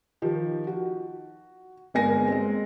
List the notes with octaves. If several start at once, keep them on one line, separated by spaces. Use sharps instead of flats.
D#3 F3 G4
F#4
G1 G#3 A#3 G#5 A#6
G#3 C4